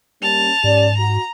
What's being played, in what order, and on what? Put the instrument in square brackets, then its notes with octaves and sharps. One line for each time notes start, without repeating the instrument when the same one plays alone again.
[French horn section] G3 A#3 C#4 [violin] A5 F7
[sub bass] G#2 [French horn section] C#4 G4 D5
[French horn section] F#4 [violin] A#5